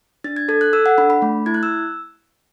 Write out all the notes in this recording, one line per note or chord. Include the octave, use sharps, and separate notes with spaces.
D4 A6
G#6
A4 G#6
F#6
A4 E6
F#5
D4 B5
B5
A3
E4 G#6
F#6
E6